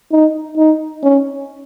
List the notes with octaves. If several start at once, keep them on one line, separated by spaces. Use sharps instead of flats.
D#4
D#4
C#4